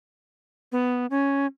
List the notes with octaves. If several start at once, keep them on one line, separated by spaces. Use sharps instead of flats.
B3
C#4